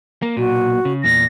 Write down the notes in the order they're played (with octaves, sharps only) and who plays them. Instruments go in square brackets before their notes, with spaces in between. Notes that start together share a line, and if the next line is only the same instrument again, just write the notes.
[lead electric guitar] A#3
[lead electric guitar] B1 A#2 [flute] F#4
[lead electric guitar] C#3
[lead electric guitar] E2 A#2 [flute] A#6